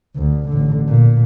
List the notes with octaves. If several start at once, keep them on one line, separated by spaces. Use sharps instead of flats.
D2
A1 D3
A#2